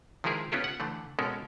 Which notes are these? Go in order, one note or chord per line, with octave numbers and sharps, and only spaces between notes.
D#3 F3 G#3 E4 G#4 A#4
B3 C#4 E4 F4 G4 A4
F#5
D3 E3 A3
B2 G#3 C#4 A4 A#4